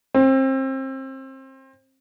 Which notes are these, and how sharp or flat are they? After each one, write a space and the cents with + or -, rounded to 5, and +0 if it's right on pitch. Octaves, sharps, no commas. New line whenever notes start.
C4 +30